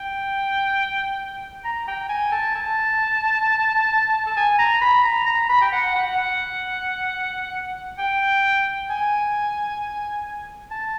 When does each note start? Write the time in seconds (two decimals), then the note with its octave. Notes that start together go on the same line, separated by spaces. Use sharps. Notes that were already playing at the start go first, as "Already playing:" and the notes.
Already playing: G5
1.65 A#5
1.88 G5
2.09 G#5
2.32 A5
2.56 A5
4.27 A5
4.37 G#5
4.59 A#5
4.82 B5
5.04 A#5
5.26 A#5
5.49 B5
5.61 G5
5.72 F#5
5.95 F#5
6.17 F#5
7.98 G5
8.90 G#5
10.71 A5